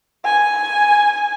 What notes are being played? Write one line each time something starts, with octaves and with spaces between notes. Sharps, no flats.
G#5